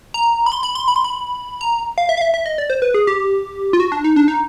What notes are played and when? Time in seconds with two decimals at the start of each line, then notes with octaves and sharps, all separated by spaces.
0.14 A#5
0.46 B5
0.52 C6
0.63 B5
0.75 C6
0.88 B5
0.96 C6
1.04 B5
1.61 A#5
1.98 F5
2.09 E5
2.17 F5
2.21 E5
2.34 E5
2.46 D#5
2.58 D5
2.70 C5
2.82 B4
2.94 G#4
3.07 G4
3.73 F4
3.80 F#4
3.92 D4
4.04 D#4
4.16 D4
4.28 D#4